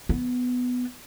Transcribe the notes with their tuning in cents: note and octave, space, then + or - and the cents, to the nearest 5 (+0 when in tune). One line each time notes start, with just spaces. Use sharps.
B3 +10